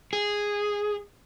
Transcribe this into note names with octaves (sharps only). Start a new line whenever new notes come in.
G#4